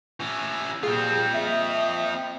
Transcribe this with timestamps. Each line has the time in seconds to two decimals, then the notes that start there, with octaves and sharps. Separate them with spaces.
0.20 E3 C#4
0.83 A#2 G3 C4 F4 G#4
1.34 A#3 D#5 E5